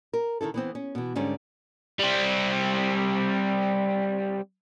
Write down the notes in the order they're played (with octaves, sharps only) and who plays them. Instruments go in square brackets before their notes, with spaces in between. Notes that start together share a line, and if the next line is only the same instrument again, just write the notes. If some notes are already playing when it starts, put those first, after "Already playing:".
[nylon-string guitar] A#4
D#3 E3 E4 A4
E3 B3 C4
C#4
B2 E3
G#2 D3 G3 C#4
[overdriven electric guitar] G3 C4